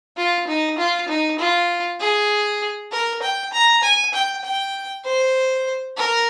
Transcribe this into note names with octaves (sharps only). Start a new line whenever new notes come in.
F4
D#4
F4
D#4
F4
G#4
A#4
G5
A#5
G#5
G5
G5
C5
A#4